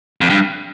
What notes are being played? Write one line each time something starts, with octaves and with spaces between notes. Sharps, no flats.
F2
G2